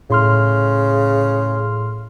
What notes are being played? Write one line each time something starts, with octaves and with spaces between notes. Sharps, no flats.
A2 C#3 C6 F6